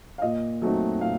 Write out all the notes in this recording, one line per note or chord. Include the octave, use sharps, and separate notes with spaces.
F5
A#2 D#5
F#3 A3 C4 D#4
A#2 F5